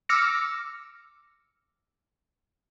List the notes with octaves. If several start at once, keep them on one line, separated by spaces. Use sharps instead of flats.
D6 E6 F6 A#6 C#7